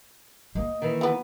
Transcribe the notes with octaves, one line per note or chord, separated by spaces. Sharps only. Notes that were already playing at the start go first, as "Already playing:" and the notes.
A#3 D#5
D#3 E3
F3 A#3 B3